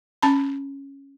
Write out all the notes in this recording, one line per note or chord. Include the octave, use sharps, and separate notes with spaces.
C#4 A5 B5